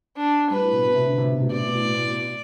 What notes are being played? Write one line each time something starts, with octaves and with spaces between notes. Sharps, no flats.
D4
G3 B4
A2
B2
B2
C3
D3
C3
B2
B2
C3 D5
B2
A2
B2
A2
B2